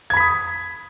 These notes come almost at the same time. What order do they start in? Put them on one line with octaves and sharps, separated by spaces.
G#6 B5 B6 D#6